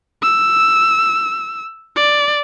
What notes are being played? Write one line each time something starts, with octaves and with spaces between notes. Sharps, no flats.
E6
D5